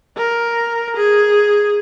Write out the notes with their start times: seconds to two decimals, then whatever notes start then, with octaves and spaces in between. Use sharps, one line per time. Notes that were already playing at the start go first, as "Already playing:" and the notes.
0.17 A#4
0.97 G#4